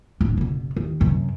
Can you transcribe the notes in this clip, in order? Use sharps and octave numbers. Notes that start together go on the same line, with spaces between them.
D1 D4
F#1 B2
D#2
F#2 C3